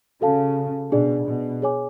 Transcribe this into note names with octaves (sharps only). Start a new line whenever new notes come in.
C#3 F#4 A4 F5 A5
B2 D4 G#4 D5
B2
G#4 C#5 G#5 D6